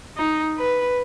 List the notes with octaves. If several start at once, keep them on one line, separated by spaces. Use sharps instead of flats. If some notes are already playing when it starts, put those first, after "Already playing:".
D#4
B4